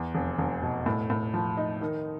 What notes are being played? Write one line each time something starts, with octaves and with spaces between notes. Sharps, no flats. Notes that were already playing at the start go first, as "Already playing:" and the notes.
Already playing: E2
F1
F1
B2
A2
A2
F3
D#4
D#3